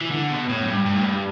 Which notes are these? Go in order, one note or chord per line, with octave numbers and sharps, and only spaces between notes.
E3
D3
B2
A2
F#2
G2
G2
A2
G2